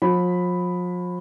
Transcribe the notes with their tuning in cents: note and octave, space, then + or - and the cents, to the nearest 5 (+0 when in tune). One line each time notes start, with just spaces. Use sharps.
F3 +40 B5 +0